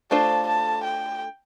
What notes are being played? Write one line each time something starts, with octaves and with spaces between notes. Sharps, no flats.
A3 D4 F4 A4 C5 A5
A5
G5